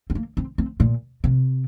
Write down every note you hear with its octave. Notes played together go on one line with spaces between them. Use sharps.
C4
A#3
C4
C4
A#2
C3